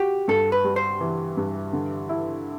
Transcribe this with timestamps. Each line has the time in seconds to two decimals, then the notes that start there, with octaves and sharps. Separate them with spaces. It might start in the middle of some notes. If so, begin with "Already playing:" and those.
Already playing: F#4 G4
0.28 G2 A4
0.52 B4
0.64 G3
0.76 C5
1.00 E3
1.37 G2
1.73 D3
2.09 E4